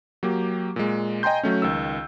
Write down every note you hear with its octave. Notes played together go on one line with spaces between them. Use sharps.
F#3 A#3 G4
A#2 G#3
D#5 G5 G#5 A#5 C6 G6
F#3 A3 C#4
C#2 D#3 E6